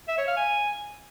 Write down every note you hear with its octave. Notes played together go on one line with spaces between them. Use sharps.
E5
C#5
F5
G#5